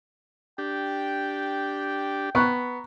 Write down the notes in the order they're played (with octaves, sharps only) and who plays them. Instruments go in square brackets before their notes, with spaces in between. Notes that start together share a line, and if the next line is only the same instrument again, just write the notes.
[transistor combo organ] D4 G4 [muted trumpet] G5
[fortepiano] B3 [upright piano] A#5 C#6 F#6